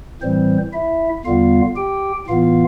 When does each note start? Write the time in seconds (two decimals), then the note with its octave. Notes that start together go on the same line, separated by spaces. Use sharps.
0.22 A2 E3 G3 C4 C5
0.73 E4 E5
1.25 E2 D3 G3 B3 F4 F5
1.76 G4 G5
2.27 A2 E3 B3 F4 F5